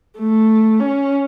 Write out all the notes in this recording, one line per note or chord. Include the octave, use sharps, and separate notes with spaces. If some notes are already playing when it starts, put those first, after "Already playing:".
A3
C#4